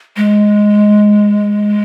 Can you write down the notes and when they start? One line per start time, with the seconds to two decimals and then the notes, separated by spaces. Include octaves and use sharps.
0.17 G#3